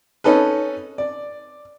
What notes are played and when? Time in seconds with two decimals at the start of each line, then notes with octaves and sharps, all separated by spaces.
0.24 C#4 D#4 A4 B4
0.98 D5